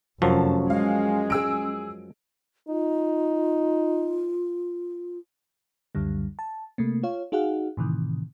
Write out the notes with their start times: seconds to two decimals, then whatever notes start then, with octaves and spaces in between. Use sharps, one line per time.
0.22 F1 F#2 F3 F#3 C#4 A5
0.70 G#3 F5
1.30 G#4 E6 D7
2.69 D#4 F4
5.95 C#2 F#2 D3 G3
6.39 A5
6.78 C3 A3 A#3
7.03 F4 C#5 F5
7.32 D#4 F#4 G#4 F5 F#5
7.77 A2 C3 D#3 E3